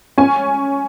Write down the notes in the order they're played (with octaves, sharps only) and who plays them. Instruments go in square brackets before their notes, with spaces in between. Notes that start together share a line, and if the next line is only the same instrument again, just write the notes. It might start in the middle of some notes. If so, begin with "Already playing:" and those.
[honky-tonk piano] C#4 G#5